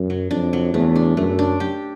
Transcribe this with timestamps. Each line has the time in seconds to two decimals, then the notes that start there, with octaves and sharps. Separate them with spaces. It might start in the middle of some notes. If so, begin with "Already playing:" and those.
Already playing: F#2
0.10 F#3
0.31 F2 D4
0.53 F#3
0.74 E2 A3
0.96 D4
1.17 F#2 A3
1.39 D4
1.60 G4